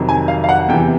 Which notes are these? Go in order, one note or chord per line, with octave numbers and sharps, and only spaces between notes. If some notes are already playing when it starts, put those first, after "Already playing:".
Already playing: F2 C3 D#3 F#3
G#5
F5
F5
F#5
E2 C3 E3 G5